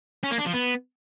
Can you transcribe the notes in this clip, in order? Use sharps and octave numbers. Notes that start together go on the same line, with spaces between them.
C#4
A#3
D4
F3
B3